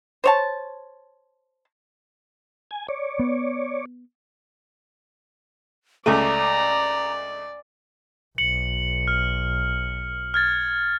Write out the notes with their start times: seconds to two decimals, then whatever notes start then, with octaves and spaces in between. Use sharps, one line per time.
0.24 C5 C#5 A5
2.71 G#5
2.88 C#5 D5
3.19 B3
6.06 C#2 A3 D5 A#5
8.38 B1 C#7 F#7
9.08 F6
10.34 F6 G#6 A6